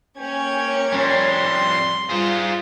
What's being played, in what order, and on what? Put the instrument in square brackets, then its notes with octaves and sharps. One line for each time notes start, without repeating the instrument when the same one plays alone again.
[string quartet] A#3 C#5 G#6 [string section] C#4 [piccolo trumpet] G5
[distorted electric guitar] F2 G3 [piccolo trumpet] C6
[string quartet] G3 [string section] F4 [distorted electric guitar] G#4 C5